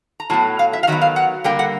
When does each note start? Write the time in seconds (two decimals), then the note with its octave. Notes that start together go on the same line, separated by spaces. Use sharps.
0.20 A#5
0.30 A2 F#3 B3 A5
0.59 F5
0.73 E5
0.83 F5
0.87 D#3 F#3 B3 E5
1.01 F5
1.16 F#5
1.44 D3 G3 A#3 G5
1.59 F#5